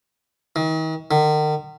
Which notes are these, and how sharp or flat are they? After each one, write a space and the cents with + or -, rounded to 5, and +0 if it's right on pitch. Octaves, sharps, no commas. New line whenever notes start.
D#3 +40
D#3 -40